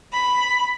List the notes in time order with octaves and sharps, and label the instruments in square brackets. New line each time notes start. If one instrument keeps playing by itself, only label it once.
[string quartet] B5